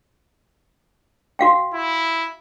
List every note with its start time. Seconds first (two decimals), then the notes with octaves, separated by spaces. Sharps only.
1.39 F#4 F5 G5
1.74 E4